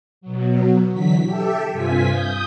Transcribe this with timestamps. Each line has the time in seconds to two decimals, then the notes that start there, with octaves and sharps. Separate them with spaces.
0.21 B2 F#3
0.93 D3 E3 F#3 B6
1.24 G4 A4 E5
1.71 G2 C3 F4 G#5 B6
2.10 D#6 G6